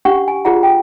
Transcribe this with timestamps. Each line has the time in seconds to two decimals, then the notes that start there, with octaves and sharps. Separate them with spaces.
0.05 C#4 D4 G4 F#5 C#6
0.28 G#5
0.45 F4 G#4 A#4 D5 F#5 A#5
0.63 G5